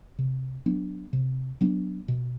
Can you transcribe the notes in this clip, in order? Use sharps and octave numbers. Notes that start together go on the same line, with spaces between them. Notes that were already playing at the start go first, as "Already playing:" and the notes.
C3
F#3 B3 D4
C3
F#3 B3 D4
B2